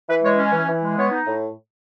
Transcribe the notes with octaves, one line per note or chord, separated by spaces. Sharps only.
E3 B4
G#3 C#5
C#4
E3
E3
G#3
B3 C#5
D#4
A2